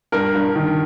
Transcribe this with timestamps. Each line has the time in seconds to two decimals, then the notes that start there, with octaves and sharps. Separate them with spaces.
0.12 G2 A#4
0.35 G2
0.56 D#3